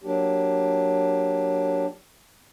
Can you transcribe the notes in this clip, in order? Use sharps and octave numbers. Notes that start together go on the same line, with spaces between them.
F#3 A#3 D4 G4